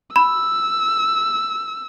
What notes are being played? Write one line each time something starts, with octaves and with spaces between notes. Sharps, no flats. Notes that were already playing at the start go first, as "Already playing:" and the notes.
B5 E6